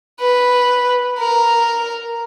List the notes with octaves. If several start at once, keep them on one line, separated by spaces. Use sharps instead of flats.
B4
A#4